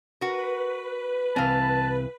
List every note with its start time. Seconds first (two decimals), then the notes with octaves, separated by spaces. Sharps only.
0.21 F#4 A#4 B4
1.36 C2 E3 C4 F5 A5